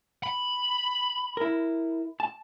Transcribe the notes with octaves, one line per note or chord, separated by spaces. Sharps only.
B5
E4 A#4
A5